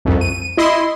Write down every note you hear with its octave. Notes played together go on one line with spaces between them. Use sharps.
C2 F2
D#7
E4 D#5 C6